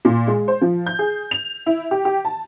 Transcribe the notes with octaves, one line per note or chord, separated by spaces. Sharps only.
A#2
G#3
C5
F3
G6
G#4
F7
E4
G4
G4
A5